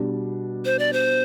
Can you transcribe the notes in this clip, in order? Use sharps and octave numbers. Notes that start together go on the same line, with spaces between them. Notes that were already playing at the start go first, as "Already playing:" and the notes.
Already playing: B2 G3 D4
C5
D5
C5